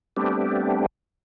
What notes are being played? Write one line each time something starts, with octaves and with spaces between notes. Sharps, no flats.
G3 A3 B3 C4 D4 G4